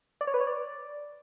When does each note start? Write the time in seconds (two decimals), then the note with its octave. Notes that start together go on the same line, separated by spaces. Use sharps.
0.21 D5
0.27 C#5
0.34 B4
0.41 C#5
0.47 D5